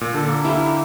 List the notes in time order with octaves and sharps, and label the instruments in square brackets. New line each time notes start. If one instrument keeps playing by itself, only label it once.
[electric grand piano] A#2
[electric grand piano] D3 [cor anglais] A4
[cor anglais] A#3
[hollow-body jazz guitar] E4 G4